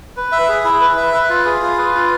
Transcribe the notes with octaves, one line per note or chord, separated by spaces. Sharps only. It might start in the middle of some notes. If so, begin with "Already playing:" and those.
B4
E5
G#4
E4
B4
E5
B4
F4
G#4
F4
B4
F4